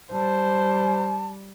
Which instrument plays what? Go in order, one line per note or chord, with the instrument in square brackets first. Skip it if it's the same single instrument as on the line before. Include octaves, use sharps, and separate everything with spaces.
[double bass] G3 [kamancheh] C5 [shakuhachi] A5